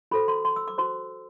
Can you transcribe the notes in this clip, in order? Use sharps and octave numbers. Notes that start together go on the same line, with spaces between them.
F#4 A4 C5 B5
C6
C6
E6
D6
F#4 C5 C6